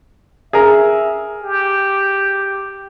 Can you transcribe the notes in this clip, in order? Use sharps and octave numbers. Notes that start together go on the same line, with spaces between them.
G#4 A#4 E5 A#5
G4